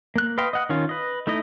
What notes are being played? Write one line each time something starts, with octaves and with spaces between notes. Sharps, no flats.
A#3 F#6
B4 D#5 F5 G5 C6
D#5 F#5 F#6
D#3 C#4 F4
B4 D#5
A3 D#4 E4 D#5